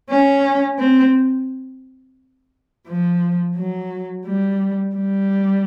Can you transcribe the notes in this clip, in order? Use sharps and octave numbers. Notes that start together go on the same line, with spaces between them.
C#4
C4
F3
F#3
G3
G3